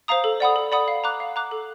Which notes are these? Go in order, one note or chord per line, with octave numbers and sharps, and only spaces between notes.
C5 F5 A#5 D#6
A4
D5 F#5 B5 D#6
A4
D5 F#5 B5 D#6
F5
A#5 D6 F#6
F5
A#5 D6 F#6
A4